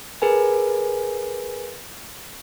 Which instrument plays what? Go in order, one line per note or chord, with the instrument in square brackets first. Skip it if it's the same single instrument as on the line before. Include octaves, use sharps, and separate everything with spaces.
[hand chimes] G#4 A#4 B4 G#5